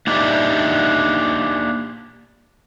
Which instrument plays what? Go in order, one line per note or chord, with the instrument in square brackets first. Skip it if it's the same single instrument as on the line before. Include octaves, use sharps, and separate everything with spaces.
[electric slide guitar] A#3 D4 D#4 G4 D5 E5